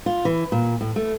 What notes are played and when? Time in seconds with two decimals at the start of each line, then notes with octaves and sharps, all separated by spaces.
0.06 F4
0.25 E3
0.52 A#2
0.81 A2
0.96 A3